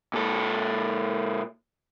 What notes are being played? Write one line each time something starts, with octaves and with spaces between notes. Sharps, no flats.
A#2 A4